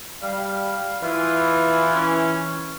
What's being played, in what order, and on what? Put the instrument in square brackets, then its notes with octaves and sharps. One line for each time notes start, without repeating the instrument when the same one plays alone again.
[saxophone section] G3 [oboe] F5
[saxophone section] E3 [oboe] F4
[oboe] C#4